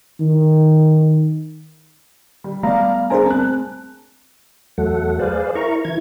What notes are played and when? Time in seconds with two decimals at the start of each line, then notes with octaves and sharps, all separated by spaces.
0.20 D#3
2.44 G3
2.63 G3 A3 B3 D5 F5 A#5 B5
3.10 D4 G#4 A#4 C5 G#5 A#5
3.26 C4 A5 F#6
4.78 E2 F#3 A3 A4 F#5
5.19 G#4 B4 C5 D5 F5
5.55 E4 A#4 A#5 C#6
5.85 E3 E4 G#6